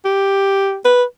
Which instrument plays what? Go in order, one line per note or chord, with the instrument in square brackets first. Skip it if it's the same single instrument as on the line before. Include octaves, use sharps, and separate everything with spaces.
[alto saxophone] G4
B4